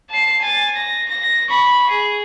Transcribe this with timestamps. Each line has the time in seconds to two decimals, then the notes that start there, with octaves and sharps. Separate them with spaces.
0.11 A5 C7
0.42 G#5 A6
0.76 A#6
1.09 A#6
1.50 B5 C#6
1.90 G#4